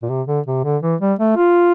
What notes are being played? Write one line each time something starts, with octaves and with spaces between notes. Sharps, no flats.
A#2
C3
D3
C3
D3
E3
G3
A3
F4